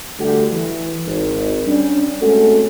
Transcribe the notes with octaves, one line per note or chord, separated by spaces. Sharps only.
D3 G3 A3 F#4 G4
E3
G#1
G3 C#4 D4
G#3 A3 C4 C#4 F#4 A4